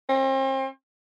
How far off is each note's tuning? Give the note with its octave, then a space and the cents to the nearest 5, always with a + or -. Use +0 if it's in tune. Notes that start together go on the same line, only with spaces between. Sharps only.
C4 +40